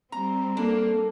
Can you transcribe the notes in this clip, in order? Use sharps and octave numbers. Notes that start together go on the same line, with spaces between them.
G3 C4 A#5
A#3 D4 A4